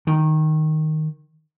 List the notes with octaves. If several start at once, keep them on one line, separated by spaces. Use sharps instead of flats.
D#3